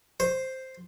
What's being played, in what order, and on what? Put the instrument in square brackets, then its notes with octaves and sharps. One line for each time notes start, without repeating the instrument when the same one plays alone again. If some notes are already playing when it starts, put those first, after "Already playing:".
[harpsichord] C5